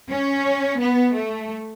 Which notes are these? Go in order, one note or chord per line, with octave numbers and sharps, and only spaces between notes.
C#4
B3
A3